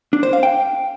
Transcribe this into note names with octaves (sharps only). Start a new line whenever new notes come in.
D4
C5
F5
G5